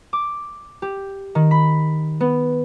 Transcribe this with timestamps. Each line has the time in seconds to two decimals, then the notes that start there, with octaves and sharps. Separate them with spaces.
0.13 D6
0.82 G4
1.35 D#3
1.51 B5
2.20 B3